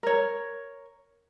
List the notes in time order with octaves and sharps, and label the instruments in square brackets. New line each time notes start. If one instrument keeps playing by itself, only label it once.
[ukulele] A#4 C#5